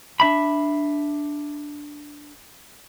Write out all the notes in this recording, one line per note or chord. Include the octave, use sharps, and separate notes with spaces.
D4 E5 B5